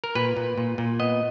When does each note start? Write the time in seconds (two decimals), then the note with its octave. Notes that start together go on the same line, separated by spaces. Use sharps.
0.04 A#4
0.15 A#2 B4
0.37 A#2
0.58 A#2
0.78 A#2
0.99 B3 D#5